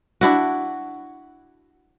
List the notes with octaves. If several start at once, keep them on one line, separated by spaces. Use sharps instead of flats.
D4 E4 F#4